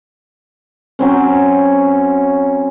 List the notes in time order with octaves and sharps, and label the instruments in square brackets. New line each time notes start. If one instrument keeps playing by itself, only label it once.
[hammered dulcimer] F#3 C4 C#4